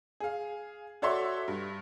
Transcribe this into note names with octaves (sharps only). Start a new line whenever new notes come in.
G#4 F5
F#4 A4 C#5 D5 E5 C6
G2